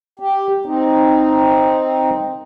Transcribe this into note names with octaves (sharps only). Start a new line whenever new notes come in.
G4
C4 D#4